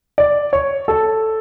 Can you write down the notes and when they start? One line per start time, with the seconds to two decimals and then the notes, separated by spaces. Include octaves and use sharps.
0.18 D5
0.53 C#5
0.88 A4